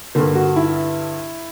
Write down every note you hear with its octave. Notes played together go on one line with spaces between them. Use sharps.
G2 D3 A#3
F#4
E4